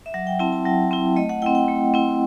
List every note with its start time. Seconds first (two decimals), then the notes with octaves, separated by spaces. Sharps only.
0.06 E5
0.14 F#3 F#5
0.27 G5
0.39 C4 E4 A5
0.53 A5
0.65 F#3 G5
0.91 C4 E4
1.16 A3 D#5
1.29 F#5
1.42 C4 E4 G5
1.55 G5
1.68 A3
1.94 C4 E4